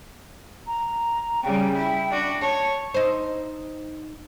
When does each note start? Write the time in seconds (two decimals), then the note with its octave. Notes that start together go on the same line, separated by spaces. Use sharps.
0.67 A#5
1.43 C#3 G3 G5
1.76 E4
2.11 D4 F#4
2.41 C#5 A5
2.94 D#4 C5